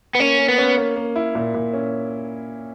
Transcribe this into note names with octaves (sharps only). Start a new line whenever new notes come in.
B3
A#3 C#4
A#3
B3
C#4
A#3
A#3
E4
A#2
A#2
C#4